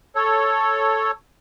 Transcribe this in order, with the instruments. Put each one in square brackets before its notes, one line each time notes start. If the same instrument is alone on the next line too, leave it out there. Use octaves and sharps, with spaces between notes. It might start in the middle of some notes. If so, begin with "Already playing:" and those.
[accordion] A4 C#5